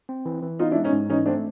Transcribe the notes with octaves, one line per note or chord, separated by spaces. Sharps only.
C4
E3
E3
B3 D#4 F4
D4 E4
G#3
C#4 D#4
G#2
E3 C#4 D#4
A3 C4 D4